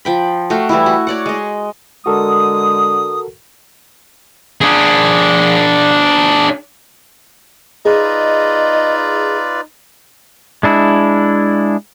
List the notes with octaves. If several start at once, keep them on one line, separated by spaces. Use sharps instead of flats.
F3 G5 B5
A3 F#4 F5 G5
E3 G3 A3 E4
F#4
C#5 D5 F#5
G#3 D#5
D3 G#3 F#4 A4 A#4 D#6
D4 G#4
D#4 F4 G#4 B4 D5 D#5
G#3 D4 E4